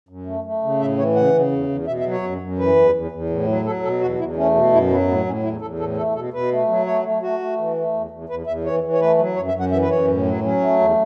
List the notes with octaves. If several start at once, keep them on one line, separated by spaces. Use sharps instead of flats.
F#2
A3
A3
C#3
A2 E5
E3 C#5
C#3 F#5
C#3
E2
E2
B2 E5
E5
F#3
C#5
F#2
F#2
E3 B4
E2
E2
E2
A2
F#3
F#3 A4
B2 A4
E2 F#4
E2 E4
A3 C#4
B2
F#2 E4
F#3 B3
A2 B3
A2 C#4
E2 E4
E2 A4
A2 A4
A3 A4
B2 A4
B2 B4
A3
F#3
A3 C#5
A3
A3 F#4
A3
E3
A3
E2
E2
E2 B4
E2 E5
E3 C#5
E3
C#5
A3 B4
F#3
F#2 C#5
E5
F#2
F#5
E3 E5
B4
F#2 C#5
A2
F#3
F#3 C#4
A3
E2